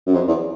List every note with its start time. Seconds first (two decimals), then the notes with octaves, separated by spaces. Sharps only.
0.07 F#2
0.14 F2
0.28 E2